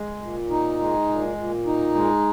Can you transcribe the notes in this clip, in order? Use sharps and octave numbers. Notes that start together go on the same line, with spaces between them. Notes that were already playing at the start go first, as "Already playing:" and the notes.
Already playing: G#3
A#2
D#4
G#3
A#2
A#2
D#4
G#3